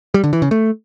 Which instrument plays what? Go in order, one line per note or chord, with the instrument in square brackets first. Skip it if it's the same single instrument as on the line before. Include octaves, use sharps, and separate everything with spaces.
[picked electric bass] G3
D3
E3
C#3
A3